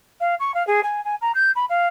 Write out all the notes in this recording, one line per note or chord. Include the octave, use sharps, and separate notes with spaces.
F5
C#6
F5
G#4
G#5
G#5
A#5
G6
B5
F5